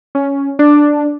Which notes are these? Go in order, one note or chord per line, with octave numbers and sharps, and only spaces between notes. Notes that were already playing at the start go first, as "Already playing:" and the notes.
C#4
D4